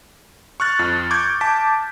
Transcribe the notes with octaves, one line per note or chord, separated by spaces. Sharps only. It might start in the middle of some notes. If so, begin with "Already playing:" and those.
C#6 F6 F#6 A6
F2 F3
C#6 D6 G6 G#6
A5 D6 B6